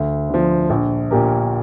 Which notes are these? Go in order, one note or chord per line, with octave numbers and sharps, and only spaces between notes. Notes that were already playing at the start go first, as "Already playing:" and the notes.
Already playing: D2
D3 F3
A#1
A#2 A#3 G4 A#4